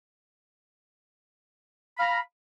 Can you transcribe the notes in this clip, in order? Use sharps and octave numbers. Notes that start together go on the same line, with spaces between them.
F5 A#5 B5